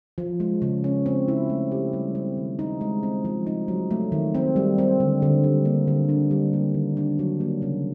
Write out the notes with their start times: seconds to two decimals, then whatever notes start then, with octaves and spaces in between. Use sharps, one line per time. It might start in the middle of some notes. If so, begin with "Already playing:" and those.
0.18 F3
0.40 G#3
0.62 C#3
0.84 C#4
1.06 C4
1.28 E4
1.49 A3
1.71 G4
1.93 G3
2.15 C4
2.37 D#3
2.59 D#4
2.81 G#3
3.03 C4
3.25 F3
3.47 D#4
3.68 F#3
3.91 A3
4.12 D#3
4.35 C4
4.56 G3
4.78 C4
5.00 D3
5.22 D3
5.44 G3
5.65 A#3
5.87 D3
6.09 D4
6.31 G3
6.53 A#3
6.74 D#3
6.97 D4
7.19 F#3
7.40 A#3
7.62 C#3